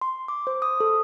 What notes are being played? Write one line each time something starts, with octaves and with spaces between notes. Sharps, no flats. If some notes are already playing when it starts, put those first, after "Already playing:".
C6
D6
C5
D#6
A4